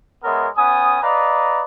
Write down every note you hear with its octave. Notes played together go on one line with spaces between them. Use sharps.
G#3 B3 A#4 C#5 E5
B3 C#4 G#5 D#6
B4 D5 D#5 F5 A#5